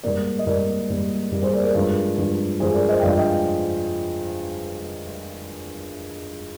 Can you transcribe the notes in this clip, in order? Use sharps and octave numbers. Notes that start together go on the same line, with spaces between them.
G#2 G3 A#3 A#4 D5
D#5
G#2 G3 A#3 A#4 D5
G#2 G3 A#3
G#2 G3 A#3
G#4 C5
A#4 D5
C5
A#4 D5
G2 F3 G#3
G2 F3 G#3
G2 F3 G#3 G#4 C5
A#4 D5
C5 D#5
G5
G2 F3 G#3 D5 F5
D#5 G5